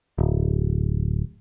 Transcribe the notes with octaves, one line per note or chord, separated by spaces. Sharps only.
D1